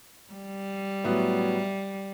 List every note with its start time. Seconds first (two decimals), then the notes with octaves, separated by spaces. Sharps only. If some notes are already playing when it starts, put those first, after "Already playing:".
0.33 G3
1.04 A2 F#3 B3 F#4